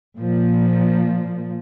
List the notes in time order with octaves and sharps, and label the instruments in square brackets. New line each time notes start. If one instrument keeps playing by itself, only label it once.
[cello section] A#2 F3